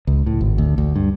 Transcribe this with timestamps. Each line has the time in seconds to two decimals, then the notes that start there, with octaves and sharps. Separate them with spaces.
0.07 C#2
0.26 A2
0.41 G#1
0.58 D2
0.78 D2
0.96 G2